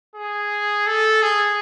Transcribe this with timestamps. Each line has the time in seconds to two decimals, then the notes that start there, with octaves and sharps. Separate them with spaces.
0.16 G#4
0.87 A4
1.22 G#4